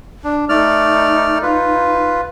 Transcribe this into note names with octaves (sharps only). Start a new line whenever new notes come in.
D4
A3 D#4 D5 F6
F4 B4